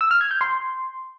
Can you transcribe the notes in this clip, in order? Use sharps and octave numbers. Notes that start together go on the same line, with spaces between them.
E6
F6
G#6
G6
C6